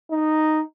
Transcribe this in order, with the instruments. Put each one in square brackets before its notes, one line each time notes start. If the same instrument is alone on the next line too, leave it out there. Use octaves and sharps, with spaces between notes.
[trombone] D#4